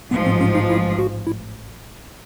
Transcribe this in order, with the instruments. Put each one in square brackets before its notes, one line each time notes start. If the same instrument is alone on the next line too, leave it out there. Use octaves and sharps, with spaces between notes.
[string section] A1 G#2 F3 [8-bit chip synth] B3
[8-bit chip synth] C4
C#4
D#4
E4
F#4
E4